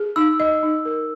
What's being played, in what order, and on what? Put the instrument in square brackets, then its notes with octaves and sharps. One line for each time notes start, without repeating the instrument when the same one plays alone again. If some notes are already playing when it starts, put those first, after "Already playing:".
Already playing: [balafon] G#4
[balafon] D#4 [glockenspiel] E6
[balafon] D#5
D#4
A#4